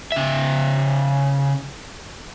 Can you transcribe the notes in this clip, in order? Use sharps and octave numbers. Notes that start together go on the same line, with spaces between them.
C#3 E5